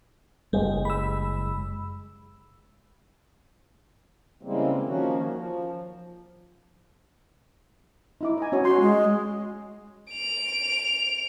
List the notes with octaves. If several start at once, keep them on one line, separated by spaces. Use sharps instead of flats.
F#1 G3 G#3
B5 E6
C#3 E3 G3 G#3 A#3 C4
D#3 F3 A#3 C#4 F#4
F3
D#4 E4 D6
D#5 G#5
C#4 F#4 C#5
F#4 C6
G#3
D7 F7